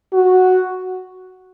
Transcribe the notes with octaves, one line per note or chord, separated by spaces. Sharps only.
F#4